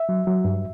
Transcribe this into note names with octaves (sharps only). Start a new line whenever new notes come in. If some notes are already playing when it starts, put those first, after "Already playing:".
Already playing: E5
F#3
F#3
G2